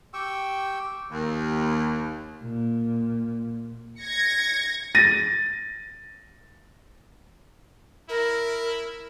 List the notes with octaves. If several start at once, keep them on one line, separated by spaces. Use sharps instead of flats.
G4 G5 C#6 E6
D#2
A#2
G#6 A#6 C#7
A6 A#6 D#7
E4 A#4